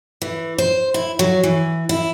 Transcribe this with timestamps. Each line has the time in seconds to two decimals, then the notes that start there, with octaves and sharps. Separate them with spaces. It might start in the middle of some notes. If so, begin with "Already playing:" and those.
0.22 E3
0.58 C5
0.94 E4
1.19 F#3
1.43 E3
1.89 E4